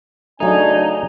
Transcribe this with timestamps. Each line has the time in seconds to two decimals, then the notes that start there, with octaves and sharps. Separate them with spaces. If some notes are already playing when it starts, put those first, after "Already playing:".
0.40 C#3 F#3 A3 D4 D#4 G#5